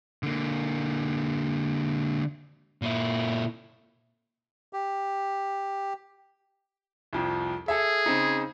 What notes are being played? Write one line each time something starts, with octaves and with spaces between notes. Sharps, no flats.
D3 A#3
A#2 E4
G4
C2 F2 F3
G#4 A4 E5
C#3 C4 D#4